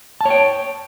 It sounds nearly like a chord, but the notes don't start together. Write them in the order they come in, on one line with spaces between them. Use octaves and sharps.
A5 C#5 G5